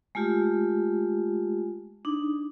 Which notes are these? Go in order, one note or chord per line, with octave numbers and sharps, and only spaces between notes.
G#3 A3 F4 G4
D4 D#4